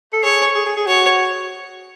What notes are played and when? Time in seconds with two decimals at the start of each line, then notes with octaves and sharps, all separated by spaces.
0.13 A4
0.23 G#4 C#5
0.55 G#4
0.66 G#4
0.77 G#4
0.87 F#4 C#5